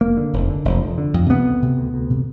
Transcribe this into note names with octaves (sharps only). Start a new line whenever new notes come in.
F1 A#3
D3
F1
D3
F1
F2
D3
F2
C3 B3
D2
C3
D2
D2
C3